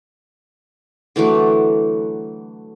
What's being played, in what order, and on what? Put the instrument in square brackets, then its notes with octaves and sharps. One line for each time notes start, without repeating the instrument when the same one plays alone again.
[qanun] D3 E3 F#3 A3